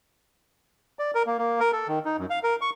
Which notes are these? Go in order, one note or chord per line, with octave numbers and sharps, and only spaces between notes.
D5
A#4
A#3
A#3
A#4
A4
D#3
D#4
F#2
F5
A#4
C#6